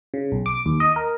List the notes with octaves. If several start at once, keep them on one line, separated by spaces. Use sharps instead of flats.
C#3
B1
D6
D#2
D#5
A#4